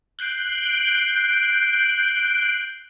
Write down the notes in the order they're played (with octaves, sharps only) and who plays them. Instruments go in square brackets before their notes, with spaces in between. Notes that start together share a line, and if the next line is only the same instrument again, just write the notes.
[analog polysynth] F#6 G6 C7 D7